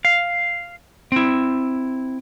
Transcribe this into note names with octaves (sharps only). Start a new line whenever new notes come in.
F5
C4 E4